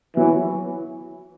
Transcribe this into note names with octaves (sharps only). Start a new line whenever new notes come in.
E3 F#3 B3 F#4 C#5